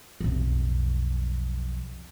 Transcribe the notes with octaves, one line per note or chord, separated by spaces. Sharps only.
B1 F2